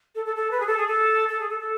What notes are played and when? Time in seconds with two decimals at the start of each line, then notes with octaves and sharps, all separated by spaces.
0.15 A4
0.25 A4
0.36 A4
0.51 B4
0.60 G#4
0.67 A4
0.77 G#4
0.87 A4
1.29 A4
1.39 G#4
1.49 A4
1.60 A4